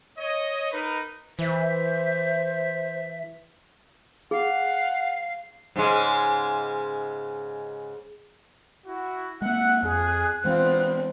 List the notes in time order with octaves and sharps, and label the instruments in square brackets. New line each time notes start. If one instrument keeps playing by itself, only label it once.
[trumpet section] C#5 D#5
D#4 A#4 B4
[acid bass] E3 [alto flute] C5 [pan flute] E5
[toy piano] G#4 [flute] F5 [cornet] F#5
[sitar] G#2 C#3 G#3
[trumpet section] E4 F#4
[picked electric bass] G#3 A#3 [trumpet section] E5 F#5 [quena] F#6
[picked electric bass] F2 [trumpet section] G#4
[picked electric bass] E3 G#3 [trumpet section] B3 F4 [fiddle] C4